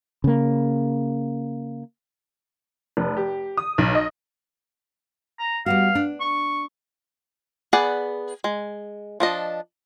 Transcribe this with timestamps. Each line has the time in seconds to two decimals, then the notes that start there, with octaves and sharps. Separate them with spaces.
0.24 C#3 A#3
2.97 F1
3.17 G4
3.57 D#6
3.78 B1
3.95 D#5
5.39 A#5
5.66 G3 B3 F#4 F5
5.95 D4
6.21 C#6
7.73 B3 G#4 D5 F#5
8.44 G#3
9.20 F3 D4 D#5